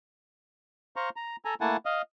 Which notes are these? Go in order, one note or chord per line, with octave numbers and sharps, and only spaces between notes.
C5 F5 A#5 C#6
A#5
A4 G#5 A#5
A3 A#3 E4 F#5 G#5 A5
D#5 F5